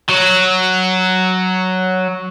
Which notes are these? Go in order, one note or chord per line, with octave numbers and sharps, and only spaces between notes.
F#3 F#4